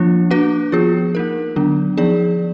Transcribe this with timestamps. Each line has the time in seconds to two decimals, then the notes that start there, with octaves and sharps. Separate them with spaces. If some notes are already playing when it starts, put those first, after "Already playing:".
Already playing: F3 A#3 D4 F4
0.31 A#3 D4 F#4 B4
0.72 F3 B3 F4 G#4
1.15 A#3 D#4 A#4
1.56 D3 F#3 B3 D4
1.97 F3 B3 D#4 G#4 D5